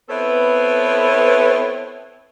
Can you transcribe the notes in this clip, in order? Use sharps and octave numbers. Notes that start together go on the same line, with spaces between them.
B3 C4 E4 A4 B4 C#5